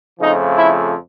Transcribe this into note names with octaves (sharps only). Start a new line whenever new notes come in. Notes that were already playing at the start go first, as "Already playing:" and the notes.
F2 C#3 F3 A3 D#4
E4